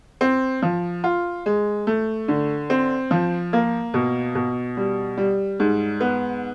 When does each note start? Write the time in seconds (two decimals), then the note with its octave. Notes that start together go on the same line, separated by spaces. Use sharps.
0.21 C4
0.62 F3
1.04 F4
1.46 G#3
1.87 A3
2.28 D3
2.70 C4
3.11 F3
3.53 A#3
3.94 B2
4.35 B2
4.77 G3
5.17 G3
5.60 G#2
6.01 B3